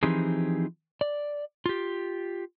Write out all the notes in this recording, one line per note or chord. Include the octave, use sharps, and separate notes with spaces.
E3 F3 C4 D#4 G4 G#4
D5
F4 G4